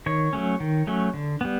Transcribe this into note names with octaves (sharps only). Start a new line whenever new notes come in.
D#3 C#5
F#3 A3 C#4
D#3
F#3 A3 C#4
D3
G3 B3